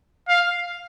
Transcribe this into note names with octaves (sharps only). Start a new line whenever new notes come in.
F5